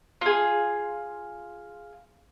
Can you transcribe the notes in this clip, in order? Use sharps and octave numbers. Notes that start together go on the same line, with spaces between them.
F4 G#4